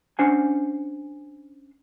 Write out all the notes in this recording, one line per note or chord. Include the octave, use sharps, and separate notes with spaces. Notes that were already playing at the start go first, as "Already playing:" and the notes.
C#4 D4 C5 F#5 G#5